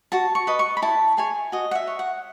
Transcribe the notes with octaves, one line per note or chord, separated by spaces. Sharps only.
F#4 A5
C#6
B4 D#5
C#6
B5
E4 A5
G#4 C#5 G#5
F#4 D#5
F#5
E5
C#5
F#5